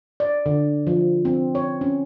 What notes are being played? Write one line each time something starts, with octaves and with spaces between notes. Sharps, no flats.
D5
D3
F3
C4
C#5
C#4